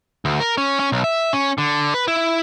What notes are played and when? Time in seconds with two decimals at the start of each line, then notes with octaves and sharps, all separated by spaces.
0.25 D2
0.40 A#4
0.58 C#4
0.79 C#4
0.92 B1
1.04 E5
1.33 C#4
1.58 D3
1.94 B4
2.08 E4